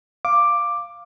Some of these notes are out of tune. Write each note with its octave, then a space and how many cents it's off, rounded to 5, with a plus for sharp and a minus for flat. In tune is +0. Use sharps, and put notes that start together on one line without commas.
F5 -5 D6 +5